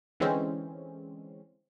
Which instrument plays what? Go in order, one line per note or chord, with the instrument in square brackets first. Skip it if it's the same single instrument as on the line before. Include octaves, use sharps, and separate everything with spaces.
[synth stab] D3 E3 G#3 C4 C#4